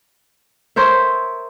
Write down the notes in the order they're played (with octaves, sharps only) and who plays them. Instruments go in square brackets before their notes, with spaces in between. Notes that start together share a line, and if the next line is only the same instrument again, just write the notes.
[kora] A#4 C5 C#5 E5